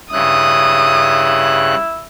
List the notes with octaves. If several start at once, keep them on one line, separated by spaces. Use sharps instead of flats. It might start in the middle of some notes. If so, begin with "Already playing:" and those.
G2 C#3 E4 D#6 F#6